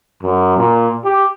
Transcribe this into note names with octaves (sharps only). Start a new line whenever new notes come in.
F#2
A#2
G4